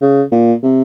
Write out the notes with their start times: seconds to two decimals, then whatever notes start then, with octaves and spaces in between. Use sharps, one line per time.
0.01 C#3
0.32 A#2
0.63 C3